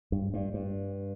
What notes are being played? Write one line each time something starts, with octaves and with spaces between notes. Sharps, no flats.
G2
G2
G2